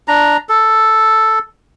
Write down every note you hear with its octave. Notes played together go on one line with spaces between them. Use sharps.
D4 A#5
A4